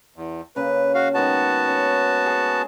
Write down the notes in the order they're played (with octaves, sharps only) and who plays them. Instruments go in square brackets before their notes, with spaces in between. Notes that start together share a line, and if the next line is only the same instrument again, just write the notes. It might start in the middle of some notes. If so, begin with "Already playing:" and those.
[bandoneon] E2
[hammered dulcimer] C#3 A#3 [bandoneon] B4
[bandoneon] F#4 F5
[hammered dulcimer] D#3 G#3 D#5 [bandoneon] B3 F#4 A5
[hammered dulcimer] C#4
G#4